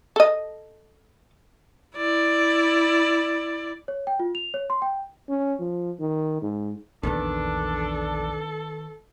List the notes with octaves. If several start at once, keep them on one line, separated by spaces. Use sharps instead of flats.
A4 D#5
E4 D5
C#5
G5
F4
F7
C#5
C6
G5
C#4
F3
D#3
G#2
A#1 E2 D#3 B3 D4 A4